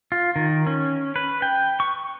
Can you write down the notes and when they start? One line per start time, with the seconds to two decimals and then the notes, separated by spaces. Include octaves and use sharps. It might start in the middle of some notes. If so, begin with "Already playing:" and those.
0.12 F4
0.36 D#3
0.67 C#4
1.16 B4
1.42 G5
1.80 C#6